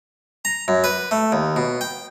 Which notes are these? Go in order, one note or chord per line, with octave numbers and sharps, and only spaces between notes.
A#5
F#2
B4
A3
D#2
B2
G5